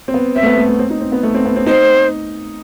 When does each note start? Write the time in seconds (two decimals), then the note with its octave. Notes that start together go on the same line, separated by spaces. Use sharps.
0.08 C4
0.14 B3
0.36 C4 E5
0.43 A3
0.46 B3
0.57 A3
0.69 A3
0.79 C4
0.90 D#4
1.01 C4
1.12 B3
1.23 A3
1.34 C4
1.46 B3
1.56 C4
1.66 D#4 C5